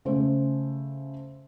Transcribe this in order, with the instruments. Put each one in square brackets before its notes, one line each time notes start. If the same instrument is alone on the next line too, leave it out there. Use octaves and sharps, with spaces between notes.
[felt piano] C#3 A3 C5